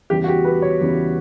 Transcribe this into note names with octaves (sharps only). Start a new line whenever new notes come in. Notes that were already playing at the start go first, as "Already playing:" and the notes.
E2 C#3 E3 G3 G4
F#4
G4
B4
C#5
E2 C#3 E3 G3